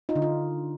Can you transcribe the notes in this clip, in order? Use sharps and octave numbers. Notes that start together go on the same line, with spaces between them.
D#4 F4
D3
F4